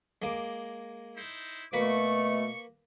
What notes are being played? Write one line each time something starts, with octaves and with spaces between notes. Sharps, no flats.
G#3 A#3 D6
D#4 E4 C5
B2 A3 A#3 B4 C#6